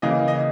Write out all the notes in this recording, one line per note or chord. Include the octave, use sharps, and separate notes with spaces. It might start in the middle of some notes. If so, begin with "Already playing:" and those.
C#3 E3 A#3 D#5
D#5